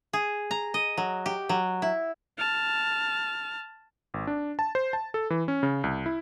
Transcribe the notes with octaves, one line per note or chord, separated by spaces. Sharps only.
G#4
A#5
D#5
F#3
G4
F#3
E4
A5 F6
G#1
D4
A5
C5
A5
A4
E3
C#4
C#3
C2
E4